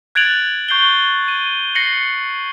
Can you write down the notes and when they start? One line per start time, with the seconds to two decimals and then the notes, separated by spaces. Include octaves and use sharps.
0.15 F#6 G#6 A6 D7 F7 F#7
0.68 C#6 G6 C7 F#7 G7
1.28 D#7
1.75 A#6 C7 C#7 F#7